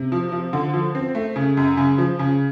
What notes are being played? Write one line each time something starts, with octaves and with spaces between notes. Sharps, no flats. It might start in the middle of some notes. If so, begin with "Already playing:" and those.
Already playing: C3
F3
F3
D3
F3
C4
A3
C#3
F#2
C#3
F3
C#3